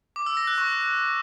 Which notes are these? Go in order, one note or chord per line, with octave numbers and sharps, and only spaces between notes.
D6
E6
A#6
F#6
C#6